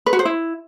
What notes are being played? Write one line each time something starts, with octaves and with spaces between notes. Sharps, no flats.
B4
F#4
C5
E4